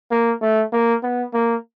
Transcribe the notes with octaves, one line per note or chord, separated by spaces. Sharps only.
A#3
A3
A#3
B3
A#3